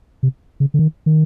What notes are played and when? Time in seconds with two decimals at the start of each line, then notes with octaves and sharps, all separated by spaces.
0.23 C3
0.60 C#3
0.74 D3
0.79 D#3
1.06 D#3